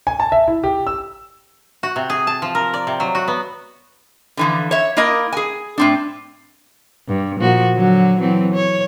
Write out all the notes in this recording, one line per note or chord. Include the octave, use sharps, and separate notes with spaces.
G#5
A5
E5
E4
G4
E6
F#4
C3
G#4
A5
F3
A#4
D5
C3
F#3
F#4
B3
D3 E3 F3
C#5 E5
A#3 E4 A#4 D#5
G#4 G#5
A2 C4 D4
G2
A#2 F3 F#4
D3 F#3 F#4
E3 F#3 C4
C#5